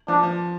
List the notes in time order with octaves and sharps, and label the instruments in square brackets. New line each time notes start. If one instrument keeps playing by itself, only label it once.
[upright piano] F3 [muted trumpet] D4
[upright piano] F3